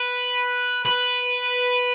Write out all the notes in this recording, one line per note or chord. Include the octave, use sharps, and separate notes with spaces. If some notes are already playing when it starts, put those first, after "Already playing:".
Already playing: B4
B4